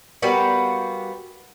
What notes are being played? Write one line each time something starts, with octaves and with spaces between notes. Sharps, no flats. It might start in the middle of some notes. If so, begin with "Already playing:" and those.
G3 A#3 B3 F#4